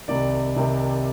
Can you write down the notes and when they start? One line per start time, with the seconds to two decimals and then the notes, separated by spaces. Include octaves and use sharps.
0.08 C2 C3 D#3 D5
0.56 C2 C3 D#3